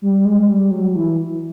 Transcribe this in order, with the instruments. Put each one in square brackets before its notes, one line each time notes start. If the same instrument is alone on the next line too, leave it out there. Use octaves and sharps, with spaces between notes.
[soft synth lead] G3
G#3
G3
F#3
E3